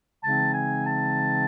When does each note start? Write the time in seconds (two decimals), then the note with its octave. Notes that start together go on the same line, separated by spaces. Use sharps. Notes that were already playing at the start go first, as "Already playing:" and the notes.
0.23 C#3 E3 G#3 C4 D#4 A5
0.54 G#5
0.84 A5